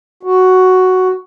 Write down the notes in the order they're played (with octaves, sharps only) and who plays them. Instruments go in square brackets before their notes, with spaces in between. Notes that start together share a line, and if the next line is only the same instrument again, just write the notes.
[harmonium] F#4